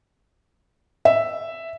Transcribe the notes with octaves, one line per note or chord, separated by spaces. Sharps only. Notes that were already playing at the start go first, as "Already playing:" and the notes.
E5